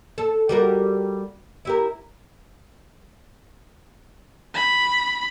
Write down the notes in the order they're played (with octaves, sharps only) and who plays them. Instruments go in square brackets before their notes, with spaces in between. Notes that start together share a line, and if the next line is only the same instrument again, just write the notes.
[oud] A4
G3 F#4 A#4
E4 G4 A#4
[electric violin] B5